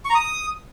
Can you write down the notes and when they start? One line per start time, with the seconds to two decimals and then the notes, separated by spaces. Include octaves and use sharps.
0.05 C#6
0.10 A#5
0.15 D#6